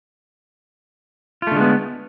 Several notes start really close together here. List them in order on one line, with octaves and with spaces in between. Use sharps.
F4 A3 D3 G#3 B3